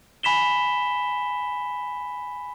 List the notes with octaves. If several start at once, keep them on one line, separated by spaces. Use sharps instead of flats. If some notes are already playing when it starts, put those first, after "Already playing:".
G#5 B5 B6 E7 G7